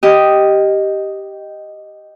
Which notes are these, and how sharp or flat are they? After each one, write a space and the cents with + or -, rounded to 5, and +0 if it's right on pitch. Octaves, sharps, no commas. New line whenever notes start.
G4 -5 D#5 +0